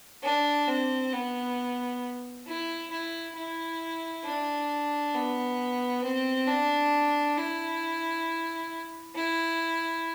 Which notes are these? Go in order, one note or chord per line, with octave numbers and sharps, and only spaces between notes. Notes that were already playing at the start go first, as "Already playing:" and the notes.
D4
C4
B3
E4
E4
E4
D4
B3
C4
D4
E4
E4